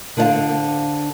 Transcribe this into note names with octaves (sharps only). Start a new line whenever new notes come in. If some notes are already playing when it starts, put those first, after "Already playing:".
D3 D4 C5 D5 F5 A5